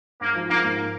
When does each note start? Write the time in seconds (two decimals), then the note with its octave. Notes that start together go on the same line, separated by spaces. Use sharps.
0.21 G#2 A#3
0.35 F3
0.50 G#2 A#3
0.64 A#3